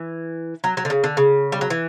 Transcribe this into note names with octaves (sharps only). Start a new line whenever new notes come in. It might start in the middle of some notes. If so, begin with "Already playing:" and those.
Already playing: E3
F#3
F#3
D3
C#3
D3
C#3
G3
F#3
E3